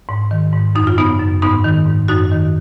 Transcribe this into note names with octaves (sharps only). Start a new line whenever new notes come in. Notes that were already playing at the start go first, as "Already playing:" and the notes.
G#2
D#3
G#2
F#2 D#4
F4
C#3 B3 D#4
F#2
G#2 B3 D#4
D#3
G#2
F#2 D#4 F#4
D#3